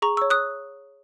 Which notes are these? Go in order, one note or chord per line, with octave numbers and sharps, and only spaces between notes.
G#4 A#5 C#6
C#5 C#6 E6
D#6 F#6